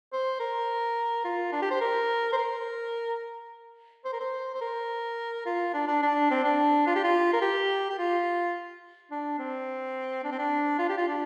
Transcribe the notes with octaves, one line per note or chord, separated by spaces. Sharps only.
C5
A#4
F4
D4
G4
C5
A#4
C5
A#4
C5
A#4
C5
C5
A#4
F4
D4
D4
D4
C4
D4
F4
G4
F4
A#4
G4
G4
F4
D4
C4
D4
C4
D4
F4
G4
F4
D4